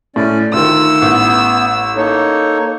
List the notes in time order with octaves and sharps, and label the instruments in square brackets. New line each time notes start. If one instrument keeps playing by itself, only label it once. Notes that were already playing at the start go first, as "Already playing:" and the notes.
[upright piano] A2 [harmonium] C#4 D5
[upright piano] D2 D#3 [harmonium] F4 [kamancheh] E6
[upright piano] A1 [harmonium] B3
[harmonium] A#3 D#4 A4 [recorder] C#5